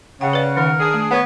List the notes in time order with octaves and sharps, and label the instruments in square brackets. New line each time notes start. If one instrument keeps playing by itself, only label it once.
[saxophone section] C#3 [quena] F#5 [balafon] G5
[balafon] B4 D5
[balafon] D#3 D#4 [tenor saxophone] A#4
[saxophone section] D4 G#4
[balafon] A3
[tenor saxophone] B3 [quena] C#5